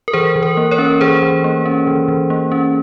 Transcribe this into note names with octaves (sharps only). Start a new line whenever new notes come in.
A#4
E3 G#4 C5
E3
A#4
A#3
A#4 C#5
C#4
E3 G#4 C5
E3
A#3
C#4
E3
E3
A#3
C#4